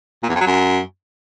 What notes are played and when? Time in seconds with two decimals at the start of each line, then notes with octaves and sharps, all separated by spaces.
0.23 A#2
0.29 E2
0.35 F2
0.40 F#3
0.46 F#2